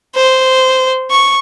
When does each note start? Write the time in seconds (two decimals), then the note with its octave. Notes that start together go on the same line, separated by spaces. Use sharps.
0.15 C5
1.11 C#6